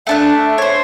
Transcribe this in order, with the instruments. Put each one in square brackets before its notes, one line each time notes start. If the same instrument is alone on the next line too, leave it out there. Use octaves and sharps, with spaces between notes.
[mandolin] A3 D4 F#6 [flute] E5
[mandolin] C5 C#5